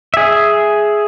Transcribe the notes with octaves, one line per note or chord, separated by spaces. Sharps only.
G#4 E5